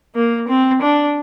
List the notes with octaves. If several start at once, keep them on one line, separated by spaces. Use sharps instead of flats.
A#3
C4
D4